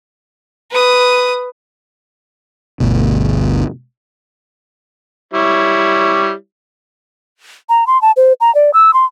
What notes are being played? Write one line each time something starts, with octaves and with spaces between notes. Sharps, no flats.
B4 D#6
G1 D2 B2
G3 E4 C#5
A#5
C6
A5
C5
A#5
D5
E6
C6